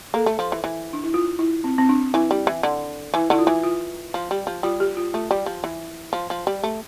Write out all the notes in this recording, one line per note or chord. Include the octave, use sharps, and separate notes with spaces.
A#3 A4
A3
F3
E3
E3
D4
E4
F4
E4
C4
C4
D4
E3 E4
G3
E3
D3
E3 E4
D3 E4
F4
E3
F4
F3
G3
F3
G3 F4
G4
F4
A3 F4
G3
F3
E3
F3
F3
G3
A3